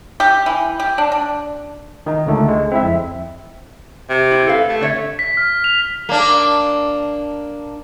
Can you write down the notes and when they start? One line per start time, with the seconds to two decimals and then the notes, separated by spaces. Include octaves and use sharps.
0.20 G4
0.46 E3
0.80 G4
0.98 D4
1.12 D4
2.06 D#3 D#4
2.26 C#2 D3 A3 A4
2.48 G#3
2.72 C4 E4 E5
2.83 F2
4.09 C3
4.31 E4
4.47 A4 B4 F5
4.69 A3
4.81 D3 C#5 E5
5.19 B6
5.37 F6
5.64 F7
6.09 A#3 D4